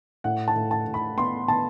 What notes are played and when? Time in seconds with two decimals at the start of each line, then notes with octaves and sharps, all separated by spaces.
0.24 A2 F#5
0.48 A5
0.56 A2
0.71 A5
0.87 A2
0.94 B5
1.17 B3 C6
1.48 B3 A5